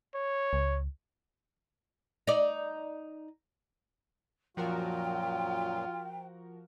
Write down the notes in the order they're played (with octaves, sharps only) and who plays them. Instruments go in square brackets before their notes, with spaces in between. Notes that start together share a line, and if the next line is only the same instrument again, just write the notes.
[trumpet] C#5
[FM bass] C#2
[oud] D#4 D5
[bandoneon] F#2 A#2 F#3 [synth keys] F3 F#4 A#4 [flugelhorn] F4 [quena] G5